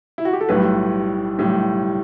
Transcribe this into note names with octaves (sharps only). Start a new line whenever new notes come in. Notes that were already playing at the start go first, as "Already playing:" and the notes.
E4
F#4
G4
A4
B1 A2 G3 B4
B1 A2 G3